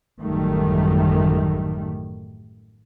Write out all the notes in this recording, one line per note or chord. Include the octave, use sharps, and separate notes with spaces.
A1 F#2 D#3 G3 A3